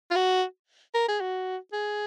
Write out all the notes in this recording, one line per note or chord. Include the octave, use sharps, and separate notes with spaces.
F4
F#4
A#4
G#4
F#4
G#4